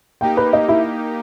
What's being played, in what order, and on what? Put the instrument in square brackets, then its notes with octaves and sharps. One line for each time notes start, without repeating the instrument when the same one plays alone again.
[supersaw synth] A#3 D#4 G4 [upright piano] G5
[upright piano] B4
D#5
E4